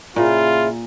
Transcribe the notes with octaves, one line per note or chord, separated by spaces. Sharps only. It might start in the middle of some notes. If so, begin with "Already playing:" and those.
A#2 C#3 E4 F4